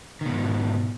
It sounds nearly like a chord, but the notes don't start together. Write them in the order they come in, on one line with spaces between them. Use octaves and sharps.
D#3 B2 G#2